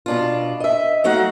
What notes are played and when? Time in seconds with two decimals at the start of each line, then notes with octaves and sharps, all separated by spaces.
0.06 B2 D4 F4
0.60 D#5 E5
1.04 F#3 A3 D#4 F#4 F5 F#5